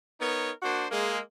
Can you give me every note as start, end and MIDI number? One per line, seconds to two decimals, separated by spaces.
0.21 0.51 59
0.21 0.51 63
0.21 0.51 70
0.21 0.51 73
0.63 0.86 58
0.63 0.86 62
0.63 0.86 66
0.63 0.86 72
0.92 1.19 56
0.92 1.19 58